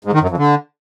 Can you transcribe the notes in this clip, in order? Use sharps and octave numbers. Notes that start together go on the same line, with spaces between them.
G#2
D#3
F#2
F2
D3